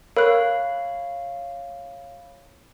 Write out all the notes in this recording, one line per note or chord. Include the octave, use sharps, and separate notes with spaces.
A#4 C#5 F5 B5 F#6